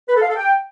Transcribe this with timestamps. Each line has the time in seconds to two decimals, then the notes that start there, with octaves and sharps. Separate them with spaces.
0.08 B4
0.15 A4
0.22 F5
0.29 A4
0.36 G5